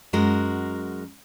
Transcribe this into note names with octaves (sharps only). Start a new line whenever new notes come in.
F#2 G#3 F#4 A#4